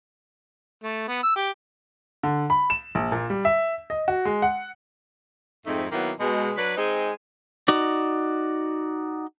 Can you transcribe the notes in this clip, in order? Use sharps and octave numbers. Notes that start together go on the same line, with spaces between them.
A3
B3
E6
G4
D3
B5
E7
A#1
A#2
G3
E5
D#5
F#4
G#3
F#5
F2 G#2 A3 C4 D#4
D#3 F#3 A#3 B3 E4
B2 G#3
F#3 D4 B4
G#3 C4 D#4 G#4
D#4 F#4 D5